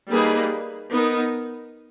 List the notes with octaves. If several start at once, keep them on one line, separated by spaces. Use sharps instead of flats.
G3 A#3 D#4 G#4 B4
B3 D#4 A#4